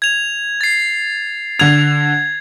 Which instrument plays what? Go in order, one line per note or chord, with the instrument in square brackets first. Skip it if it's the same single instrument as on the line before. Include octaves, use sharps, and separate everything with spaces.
[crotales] G#6 F7
A6 C7
[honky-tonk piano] D3 F7 [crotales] G#6